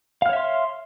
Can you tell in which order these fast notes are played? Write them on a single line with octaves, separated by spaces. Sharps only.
F5 F6 C#5 E5 C6